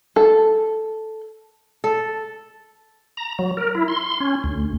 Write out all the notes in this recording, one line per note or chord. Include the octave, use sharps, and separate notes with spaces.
A4
A4
A#5
F#3
A#4
E4
C6
C6
C#4
D2